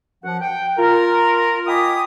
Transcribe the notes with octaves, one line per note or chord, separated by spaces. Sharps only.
F#2 F3 F#5
G5
F4 A#4
D#5 G5 G#5 B5 D6 D#6